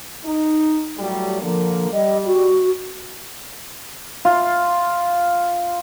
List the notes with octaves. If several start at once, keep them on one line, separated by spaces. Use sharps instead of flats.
D#4
A2 F#3 G3
A#2 D3 F3 A#3
G3 D#5
F#4
F4